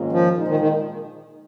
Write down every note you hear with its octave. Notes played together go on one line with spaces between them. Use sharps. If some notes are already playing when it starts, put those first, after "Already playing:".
Already playing: G#2 D#3 A#3 C#4 F4
F3
A#2 G#3 D#4
D#3
D#3